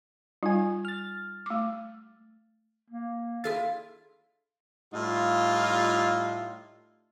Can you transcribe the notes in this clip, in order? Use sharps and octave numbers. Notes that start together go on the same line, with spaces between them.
G3 D#4 F4 G#5
F6 A6
A3 D6
A#3
E4 F4 G#4 A4 F5 A6
A2 G3 D#4 F4